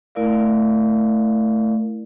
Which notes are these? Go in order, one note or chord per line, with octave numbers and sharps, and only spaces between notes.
A3 E4 A#4 D5 F5